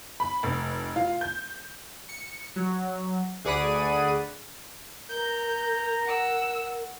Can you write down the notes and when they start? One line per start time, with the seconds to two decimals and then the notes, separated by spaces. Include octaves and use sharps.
0.20 B5
0.43 F1
0.96 F4
1.21 G6
2.09 C#7
2.56 F#3
3.44 D2 G#4 D5 F#5 B5 D#7
5.09 A#4 A#5 G6
6.04 F#5 E6